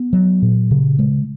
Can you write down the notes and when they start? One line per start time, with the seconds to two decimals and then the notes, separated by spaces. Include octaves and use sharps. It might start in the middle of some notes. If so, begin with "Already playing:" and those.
Already playing: B3
0.13 F#3
0.42 A#2
0.71 C#3
0.99 G#3